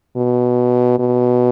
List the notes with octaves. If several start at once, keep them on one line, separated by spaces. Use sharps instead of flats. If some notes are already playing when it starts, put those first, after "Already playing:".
B2
B2